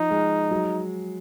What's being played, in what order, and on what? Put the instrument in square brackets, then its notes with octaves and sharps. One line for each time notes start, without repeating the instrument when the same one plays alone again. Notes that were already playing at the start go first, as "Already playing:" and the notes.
Already playing: [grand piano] F3 [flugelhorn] D#4
[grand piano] G#3
F#3